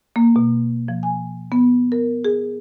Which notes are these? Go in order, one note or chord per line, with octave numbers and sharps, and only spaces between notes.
A#3
B2
F3
G#5
B3
A#4
G#4